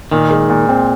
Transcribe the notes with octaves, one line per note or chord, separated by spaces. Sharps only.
A#2 D#3
G#3
A#2
C4